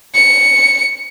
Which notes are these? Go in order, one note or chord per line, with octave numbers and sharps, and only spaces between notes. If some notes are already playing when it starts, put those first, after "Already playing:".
C#7